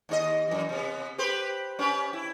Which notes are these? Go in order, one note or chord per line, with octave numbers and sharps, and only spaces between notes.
D#2 D#4 D#5
F#2 E3
C3 B3
G4 B4 C5
C#4 G4 B4
E4